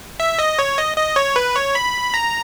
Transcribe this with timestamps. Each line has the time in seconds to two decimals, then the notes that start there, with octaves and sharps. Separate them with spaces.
0.20 E5
0.39 D#5
0.59 C#5
0.78 D#5
0.97 D#5
1.16 C#5
1.36 B4
1.56 C#5
1.75 B5
2.14 A#5